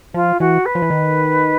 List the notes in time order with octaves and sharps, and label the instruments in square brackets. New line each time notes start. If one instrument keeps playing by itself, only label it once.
[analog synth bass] F3 [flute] F4
[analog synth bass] E3 [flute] F#4
[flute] B4
[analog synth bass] F3
E3
D#3